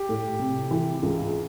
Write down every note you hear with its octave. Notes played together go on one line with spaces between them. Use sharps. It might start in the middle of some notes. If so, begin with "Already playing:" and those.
Already playing: G4
A2
C3
E3
C#2